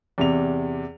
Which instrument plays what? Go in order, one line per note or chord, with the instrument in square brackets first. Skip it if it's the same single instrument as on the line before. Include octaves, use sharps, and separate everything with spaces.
[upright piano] E2 C3 F7